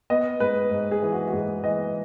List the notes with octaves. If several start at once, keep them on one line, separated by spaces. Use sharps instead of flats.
B3 D#5
G#2 B4
G#2
G#4
E3
F#4
F#4
G#2 G#4
E3 D#5